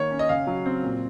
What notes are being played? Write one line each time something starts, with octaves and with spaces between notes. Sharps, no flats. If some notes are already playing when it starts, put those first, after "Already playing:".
Already playing: D#3 A#3 C#5
C#4
D#5
C#3 F5
F#3
C4
A#2